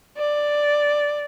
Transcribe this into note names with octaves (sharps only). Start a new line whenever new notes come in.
D5